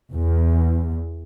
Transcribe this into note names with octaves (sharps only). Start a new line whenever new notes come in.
E2